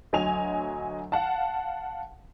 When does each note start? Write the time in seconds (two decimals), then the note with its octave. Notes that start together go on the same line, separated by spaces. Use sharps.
0.13 D2 F#3 D#5 G#5 F7
1.12 F5 F#5 A5